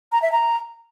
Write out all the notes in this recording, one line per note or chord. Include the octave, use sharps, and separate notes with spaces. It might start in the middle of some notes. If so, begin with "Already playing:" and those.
A#5
E5
A#5